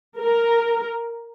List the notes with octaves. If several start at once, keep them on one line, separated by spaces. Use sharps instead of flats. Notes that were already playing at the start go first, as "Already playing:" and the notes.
A#4